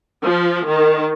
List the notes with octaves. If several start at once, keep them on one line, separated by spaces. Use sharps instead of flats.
F3
D#3